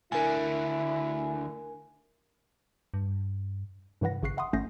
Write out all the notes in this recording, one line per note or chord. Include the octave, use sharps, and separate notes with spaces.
D2 D3 E4 A#4 G#5
G2
G2 C3 E3 B4 F#5 A#6
G#1 C#3 C#6 F#6 C7
E5 F#5 B5 C6 D#6
G#1 A3 C#4 G6 A#6 C7